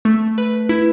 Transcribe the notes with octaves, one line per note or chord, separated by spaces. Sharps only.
A3
B4
E4